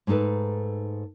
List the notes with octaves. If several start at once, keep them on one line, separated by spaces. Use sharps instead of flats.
G#2 A3 D#4 A4 B4